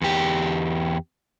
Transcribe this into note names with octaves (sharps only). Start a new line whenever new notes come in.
E2 G4